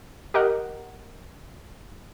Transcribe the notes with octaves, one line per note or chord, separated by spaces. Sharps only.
G4 A#4 D#5 F#5